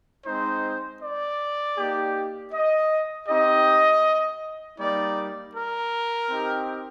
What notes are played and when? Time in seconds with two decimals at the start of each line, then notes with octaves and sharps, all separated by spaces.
0.25 G#3 C4 D#4 C5
1.00 D5
1.76 A#3 D#4 G4
2.52 D#5
3.27 C4 D#4 G4 D#5
4.78 G3 A#3 D#4 D5
5.54 A#4
6.29 C4 D#4 G4